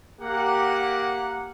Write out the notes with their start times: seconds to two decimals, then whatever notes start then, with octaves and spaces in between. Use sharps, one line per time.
0.21 A#3 G4 F#5